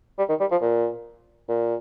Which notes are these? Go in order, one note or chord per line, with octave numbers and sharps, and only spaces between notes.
G3
D#3
G3
F3
A#2
A#2